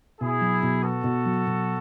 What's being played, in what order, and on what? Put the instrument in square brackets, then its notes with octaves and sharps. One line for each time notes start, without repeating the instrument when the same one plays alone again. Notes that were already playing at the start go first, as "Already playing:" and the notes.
[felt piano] B2 [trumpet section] E4 G#4
[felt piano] F#3
B2
[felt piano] B3 [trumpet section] F#4 A4
[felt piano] B2
F#3
B2